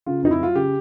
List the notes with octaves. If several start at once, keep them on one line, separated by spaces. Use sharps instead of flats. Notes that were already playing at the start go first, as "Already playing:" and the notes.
C#3 F4
F2 D#4
E4
F#3 F4
C#3 G4